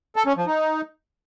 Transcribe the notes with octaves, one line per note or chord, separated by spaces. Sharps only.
A4
C#4
F3
D#4